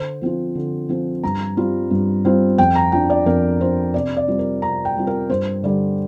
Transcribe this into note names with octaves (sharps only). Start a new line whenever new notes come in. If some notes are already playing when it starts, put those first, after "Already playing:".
Already playing: D3 C5
F3 C4 F4
D3
F3 C4 F4
G2 A#5
G3 C4 F4
G2
G3 C4 F4
F2 G5
A#5
F3 D4 G5
D5
F2 A#4
F3 D4 C5
C3 D5
D5
G3 C4 F4
A#4
C3 A#5
G5
G3 C4 F4
A#4
G2 C5
D3 G3 D5